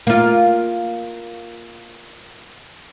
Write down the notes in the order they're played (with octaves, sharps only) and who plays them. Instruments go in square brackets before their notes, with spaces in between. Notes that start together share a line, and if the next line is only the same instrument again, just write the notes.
[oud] A#3 F4